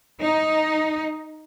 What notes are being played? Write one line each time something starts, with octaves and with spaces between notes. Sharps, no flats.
D#4